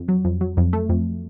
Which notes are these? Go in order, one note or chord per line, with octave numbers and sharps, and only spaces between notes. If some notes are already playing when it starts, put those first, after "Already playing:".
Already playing: F2
F#3
F2
F#3
F2
A3
F2